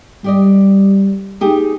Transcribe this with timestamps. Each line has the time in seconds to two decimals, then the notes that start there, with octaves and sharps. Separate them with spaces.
0.24 G3 G4 D5 D#5
1.41 D#4 G4 G#4